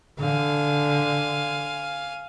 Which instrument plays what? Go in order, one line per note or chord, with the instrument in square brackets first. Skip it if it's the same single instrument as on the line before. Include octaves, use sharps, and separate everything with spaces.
[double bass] D3 [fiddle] F5 G#5